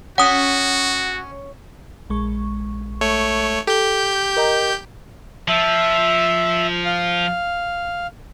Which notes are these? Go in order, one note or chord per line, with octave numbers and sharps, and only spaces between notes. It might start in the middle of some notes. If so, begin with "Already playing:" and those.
C#4 F#4 F#5 D#6
A#1 G#3 C#6
A3 C#5
G4 A4 G6
A#4 D#5 A#5
F3 E5
F5